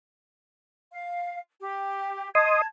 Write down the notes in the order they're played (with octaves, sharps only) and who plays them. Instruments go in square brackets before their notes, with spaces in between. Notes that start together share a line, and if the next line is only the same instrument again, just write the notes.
[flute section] F5
G4
[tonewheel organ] D#5 C6 D#6 [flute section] A5 G#6